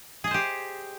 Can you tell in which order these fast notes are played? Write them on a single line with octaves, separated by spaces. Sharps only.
G#4 D#5 C5 G4